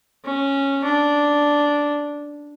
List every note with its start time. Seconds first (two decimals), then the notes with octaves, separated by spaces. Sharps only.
0.25 C#4
0.84 D4